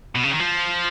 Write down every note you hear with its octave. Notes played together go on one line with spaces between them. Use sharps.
B2
C#3
D#3
F3